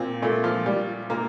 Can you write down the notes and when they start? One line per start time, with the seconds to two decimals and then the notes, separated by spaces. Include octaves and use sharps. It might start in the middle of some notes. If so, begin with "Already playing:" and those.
Already playing: A#2 C4
0.22 A#2 A3
0.44 F3
0.66 A#2 G3
1.10 A#2 A#3